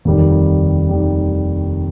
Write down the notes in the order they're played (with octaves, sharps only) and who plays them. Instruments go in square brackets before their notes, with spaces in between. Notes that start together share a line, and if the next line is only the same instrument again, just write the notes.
[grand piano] F1 D#2 D#3 G3
D#3 G3